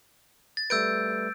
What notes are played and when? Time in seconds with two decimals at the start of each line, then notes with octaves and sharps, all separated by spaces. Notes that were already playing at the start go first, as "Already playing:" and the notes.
0.57 A6
0.70 G3 A3 B4 E6 G6 D7